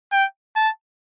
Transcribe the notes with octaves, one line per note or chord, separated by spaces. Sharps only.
G5
A5